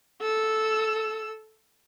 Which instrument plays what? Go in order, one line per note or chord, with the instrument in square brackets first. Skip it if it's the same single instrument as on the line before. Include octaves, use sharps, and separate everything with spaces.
[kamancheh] A4 E6